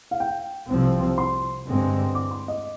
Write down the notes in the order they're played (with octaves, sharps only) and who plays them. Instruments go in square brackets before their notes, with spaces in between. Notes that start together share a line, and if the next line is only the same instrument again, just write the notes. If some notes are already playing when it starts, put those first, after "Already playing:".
[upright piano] F5
G5
[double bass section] C2 C3 F3 C4
[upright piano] C6
[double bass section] G2 D3 G#3 C4
[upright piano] D6
C6
D#5